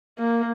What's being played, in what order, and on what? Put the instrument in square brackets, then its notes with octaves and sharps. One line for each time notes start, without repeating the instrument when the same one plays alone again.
[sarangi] A#3